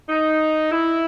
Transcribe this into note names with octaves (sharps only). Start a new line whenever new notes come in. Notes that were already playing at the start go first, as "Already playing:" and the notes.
D#4
E4